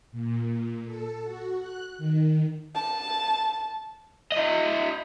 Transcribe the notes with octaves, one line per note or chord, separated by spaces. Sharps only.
A#2
A4
F#4
F#6
D#3
A5
E4 D#5